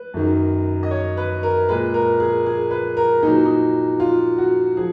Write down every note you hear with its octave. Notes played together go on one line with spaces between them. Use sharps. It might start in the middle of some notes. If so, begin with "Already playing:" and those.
Already playing: B4
F#2 D#3 F#3
D#5
C#5
B4
A#4
A#2 G#3 B4
A#4
G#4
G#4
B4
A#4
A#2 F#3 D#4
D#4
F4
F#4
F3 G#4